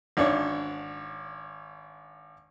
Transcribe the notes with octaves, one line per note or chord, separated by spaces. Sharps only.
G#1 D4 C#5